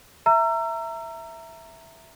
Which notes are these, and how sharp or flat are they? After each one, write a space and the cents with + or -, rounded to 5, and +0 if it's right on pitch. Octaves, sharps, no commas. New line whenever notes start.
E5 +0 A#5 -15 E6 +35